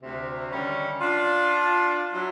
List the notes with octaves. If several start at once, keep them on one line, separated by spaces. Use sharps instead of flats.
D2 C3
D3 D#3 G3 C#4
D4 F4
F#3 E4